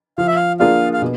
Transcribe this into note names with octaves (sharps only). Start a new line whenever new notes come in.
F3 F5
E5
F5
A#3 D4 F4 G#4 F5
F5
B2